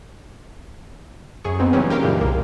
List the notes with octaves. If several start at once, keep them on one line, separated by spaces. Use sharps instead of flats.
F#2 G#4 C#6
B3 C4 D#4
C#3 E3 F#3 G3 C#4
A#3 G4 A#4 F5 G5
F#2 A#2 D3 E3 G#3
C2 A#3